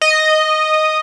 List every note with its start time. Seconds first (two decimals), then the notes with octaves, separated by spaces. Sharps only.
0.02 D#5